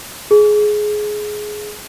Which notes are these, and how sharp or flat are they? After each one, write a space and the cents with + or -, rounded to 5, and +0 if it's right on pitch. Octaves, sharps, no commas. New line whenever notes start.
G#4 +15